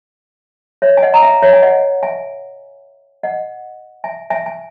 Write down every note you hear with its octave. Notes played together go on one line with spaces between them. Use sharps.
C#5 E5
G#5
D#5 F#5
A#5
E5 G#5
C#5 E5
G#5
D#5 F#5
E5 G#5
D#5 F#5
E5 G#5
E5 G#5
G#5